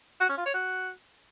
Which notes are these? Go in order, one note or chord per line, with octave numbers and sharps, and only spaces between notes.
F#4
C#4
F4
C#5
F#4